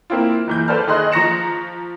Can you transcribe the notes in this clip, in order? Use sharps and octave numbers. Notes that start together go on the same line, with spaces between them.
A#3 C4 E4 F4
F#1 E3 G6
A4 B4 C5 D5 A5 F6
D#3 G#4 D#5 C6 F#6
F3 A#5 C#6 A#6 C#7 E7